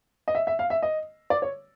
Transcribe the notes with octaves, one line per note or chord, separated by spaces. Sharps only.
D#5
E5
E5
F5
E5
D#5
D5
C#5